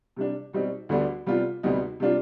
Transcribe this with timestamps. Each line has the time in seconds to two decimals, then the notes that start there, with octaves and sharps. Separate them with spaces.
0.17 C3 G3 D4
0.53 B2 G3 C4 D#4
0.89 D2 D3 G3 B3 D4
1.26 C3 G3 B3 F4
1.63 D2 C3 G3 B3 D#4
2.00 C3 G3 D4 F4